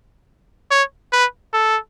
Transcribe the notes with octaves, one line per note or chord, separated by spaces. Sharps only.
C#5
B4
A4